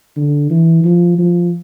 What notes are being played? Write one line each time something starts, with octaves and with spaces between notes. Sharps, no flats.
D3
E3
F3
F3